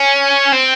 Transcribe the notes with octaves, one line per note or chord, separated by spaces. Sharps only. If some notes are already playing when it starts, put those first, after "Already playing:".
Already playing: C#4
C4